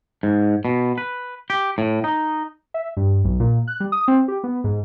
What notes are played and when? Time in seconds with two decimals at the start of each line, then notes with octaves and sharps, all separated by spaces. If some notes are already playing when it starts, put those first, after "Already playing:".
0.23 G#2
0.65 B2
0.98 B4
1.50 G4
1.78 A2
2.04 D#4
2.74 E5
2.97 G2
3.24 B1
3.40 A#2
3.68 F#6
3.80 G3
3.92 D#6
4.08 C4
4.28 G4
4.44 B3
4.64 G#2